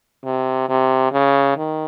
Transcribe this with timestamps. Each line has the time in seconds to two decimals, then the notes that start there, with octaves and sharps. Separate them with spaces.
0.25 C3
0.69 C3
1.13 C#3
1.57 D#3